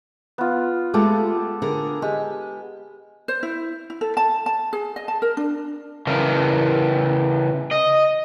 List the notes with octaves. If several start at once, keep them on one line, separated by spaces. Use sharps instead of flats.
B3 F4
G#3 A3 F4 G4 A4
D3 G#4 A#4
G#3 G4
C5
E4
E4
A4
A5
A5
G#4
D#5
A5
A#4
D4
C#3 E3 A#4
D#5